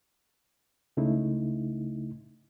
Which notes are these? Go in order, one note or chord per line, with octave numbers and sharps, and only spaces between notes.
C#2 C#3 A3 D#4 E4